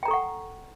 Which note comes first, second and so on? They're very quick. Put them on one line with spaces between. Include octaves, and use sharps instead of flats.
G5 A#5 A4 C#6 F#5